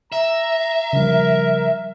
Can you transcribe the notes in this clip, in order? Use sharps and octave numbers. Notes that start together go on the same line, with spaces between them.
E5 A#5
C#3 F3 G3 A#4